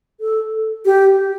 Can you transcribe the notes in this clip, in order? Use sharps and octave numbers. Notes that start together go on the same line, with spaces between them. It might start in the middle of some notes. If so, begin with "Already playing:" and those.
A4
G4